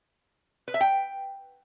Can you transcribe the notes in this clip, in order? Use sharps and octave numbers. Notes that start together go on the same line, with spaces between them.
B4
E5
G5